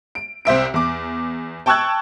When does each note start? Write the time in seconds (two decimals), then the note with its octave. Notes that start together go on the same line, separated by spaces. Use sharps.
0.15 D7
0.45 C2 C5 E5 D7
0.74 E2 D6
1.66 G5 A5 C#6 E6 F#6 G#6